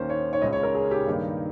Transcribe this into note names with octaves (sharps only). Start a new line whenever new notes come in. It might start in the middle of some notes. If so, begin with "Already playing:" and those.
Already playing: D#2 D#3 A#3 C#4 C5
C#5
C#5
C#2 C#3 G#3 C#4 D#5
C#5
A#4
G#4
G4
G2 D#3 A#3 D#4